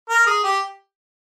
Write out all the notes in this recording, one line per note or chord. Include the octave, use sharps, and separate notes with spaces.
A#4
G#4
G4